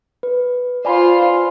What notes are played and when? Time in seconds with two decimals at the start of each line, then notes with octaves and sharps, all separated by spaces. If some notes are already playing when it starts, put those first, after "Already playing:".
0.23 B4
0.85 F4 C5 D5 G#5 B5